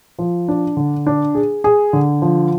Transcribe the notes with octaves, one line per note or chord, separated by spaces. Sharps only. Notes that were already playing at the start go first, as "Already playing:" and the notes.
F3
D4
D3
D4
G#4
G#4
D3
F3